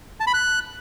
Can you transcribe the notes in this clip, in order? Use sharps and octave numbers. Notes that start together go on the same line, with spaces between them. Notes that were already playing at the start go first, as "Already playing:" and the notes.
A5
B5
F#6